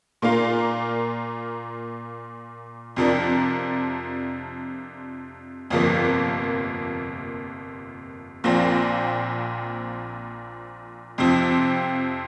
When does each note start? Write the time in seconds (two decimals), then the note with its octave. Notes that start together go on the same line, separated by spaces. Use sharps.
0.22 A#2 A#3 F4 A#4
2.96 F2 C3 F3 D4 A#4
5.70 G1 F2 C3 F3 A#3
8.44 A#1 A#2 F3 C4
11.18 F2 C3 F3 C4